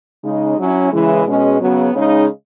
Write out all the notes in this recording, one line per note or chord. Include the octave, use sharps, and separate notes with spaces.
C#3 G#3 D#4
F#3 C#4 E4
C#3 E3 G#3
B2 G#3 C#4
C#3 F#3 B3
C#3 G#3 D#4